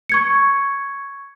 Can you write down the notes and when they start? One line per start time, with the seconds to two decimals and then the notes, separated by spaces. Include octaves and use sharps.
0.09 C#6 G#6 C#7